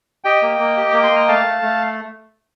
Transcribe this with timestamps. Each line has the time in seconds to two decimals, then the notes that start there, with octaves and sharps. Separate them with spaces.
0.24 G4 D#5 G5
0.42 A#3
0.59 A#3
0.77 G4
0.91 A#3 D6
1.03 C6
1.11 A#3 A#5
1.28 A3 F5 A5
1.46 A3
1.62 A3